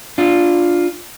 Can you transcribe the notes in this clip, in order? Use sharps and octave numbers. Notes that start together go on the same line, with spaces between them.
D4 F4